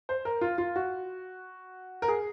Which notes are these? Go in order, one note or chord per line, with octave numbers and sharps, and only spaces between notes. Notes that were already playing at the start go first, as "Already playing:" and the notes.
C5
A#4
F4
F4
F#4
A#4
G#4